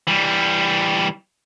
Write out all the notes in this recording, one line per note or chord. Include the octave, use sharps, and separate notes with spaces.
E3 G3